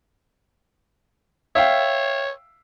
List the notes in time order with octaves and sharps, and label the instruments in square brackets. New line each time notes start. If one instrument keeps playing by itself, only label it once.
[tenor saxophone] C#5 [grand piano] E5 F5 G5